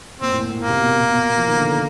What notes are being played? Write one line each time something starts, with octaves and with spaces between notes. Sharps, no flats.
A#2 C4
A2
A#2
A2
A#2 A#3
C3
B2
A#2
A#2
B2
A#2
B2
F3
D#3
D3
D3